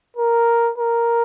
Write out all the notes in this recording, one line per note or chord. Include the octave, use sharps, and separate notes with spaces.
A#4
A#4